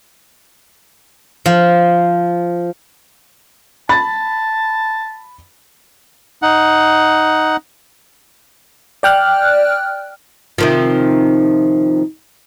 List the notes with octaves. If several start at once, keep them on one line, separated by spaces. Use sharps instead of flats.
F3
A5 B5 A6
D#4 F#5
D5 G5 F6 F#6
C3 D#3 F3